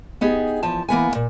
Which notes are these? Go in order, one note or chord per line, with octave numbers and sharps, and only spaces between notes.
B3 D#4 G4 G#4
E2 F3 A5
E3 A#3 B3 G#5
D#2 A#2